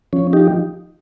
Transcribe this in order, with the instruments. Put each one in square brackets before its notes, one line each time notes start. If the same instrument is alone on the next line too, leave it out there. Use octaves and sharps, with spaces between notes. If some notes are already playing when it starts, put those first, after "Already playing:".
[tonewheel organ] F3 C#4
D#4 G4